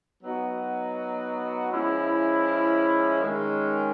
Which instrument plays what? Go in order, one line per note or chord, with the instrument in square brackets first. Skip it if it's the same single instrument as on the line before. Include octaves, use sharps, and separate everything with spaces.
[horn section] F#3 B3 D#4 F#4
F3 G#3 C#4 E4
D#3 G#3 C#4